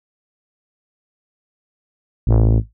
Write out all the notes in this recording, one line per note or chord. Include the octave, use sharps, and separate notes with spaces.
A1